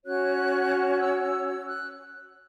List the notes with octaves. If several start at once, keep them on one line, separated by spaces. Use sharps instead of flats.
C#4 F#4 C#5 F#6
F#6
E6
E6
E6
F#6